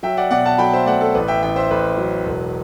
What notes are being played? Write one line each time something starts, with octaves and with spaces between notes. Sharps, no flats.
F#3 E5 G5
D5 F#5
B2 D5 F#5
F#5 A5
F#3 G5 B5
C5 E5
A3 D5 F#5
A4
A1 B4
E5 G5
A1 E5 G5
C5 E5
A1 B4
F#3
E1